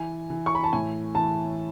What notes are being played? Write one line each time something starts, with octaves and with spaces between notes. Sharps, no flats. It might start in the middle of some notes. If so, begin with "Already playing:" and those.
Already playing: E3 G#5
E3
C#6
B5
A5
A2 G#5
E3 A5